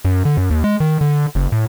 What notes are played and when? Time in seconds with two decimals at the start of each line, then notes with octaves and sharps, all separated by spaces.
0.05 F#2
0.25 D3
0.37 F#2
0.50 D#2
0.64 G#3
0.80 D#3
1.01 D3
1.35 F#1
1.52 A2